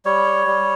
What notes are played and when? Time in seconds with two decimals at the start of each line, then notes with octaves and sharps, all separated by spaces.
0.05 G3 C#5
0.47 G3